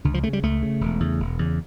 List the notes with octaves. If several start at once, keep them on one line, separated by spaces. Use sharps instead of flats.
C#2 D3
F3
C#3 A3
G3
C#2 A3
C#3
E1
E2 C#3
E1
E2 C#3